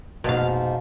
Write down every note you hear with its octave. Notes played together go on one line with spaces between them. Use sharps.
F1 G#2 B2 F3 A#3 F5